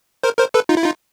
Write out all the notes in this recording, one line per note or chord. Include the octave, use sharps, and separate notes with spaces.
A#4 C5
A#4 C5
A4 B4
D#4 F4
E4
D#4 F4